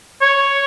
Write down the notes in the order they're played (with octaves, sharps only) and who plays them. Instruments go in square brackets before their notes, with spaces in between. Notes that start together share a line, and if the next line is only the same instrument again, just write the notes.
[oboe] C#5